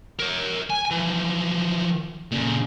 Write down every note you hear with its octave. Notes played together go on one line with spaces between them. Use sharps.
A#4 C#5
G#5
E3 F3
A#2 C#3